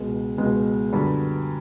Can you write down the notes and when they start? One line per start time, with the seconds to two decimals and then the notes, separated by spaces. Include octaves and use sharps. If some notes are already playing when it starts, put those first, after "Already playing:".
Already playing: C#2 B2 G#3
0.38 C#2 B2 G#3
0.92 F#2 D3 G3 B3